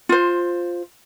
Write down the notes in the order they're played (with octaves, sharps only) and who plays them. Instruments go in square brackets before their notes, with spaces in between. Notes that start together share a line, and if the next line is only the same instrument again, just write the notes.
[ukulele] F4 C5